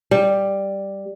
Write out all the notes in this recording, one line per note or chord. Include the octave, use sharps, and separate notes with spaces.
G3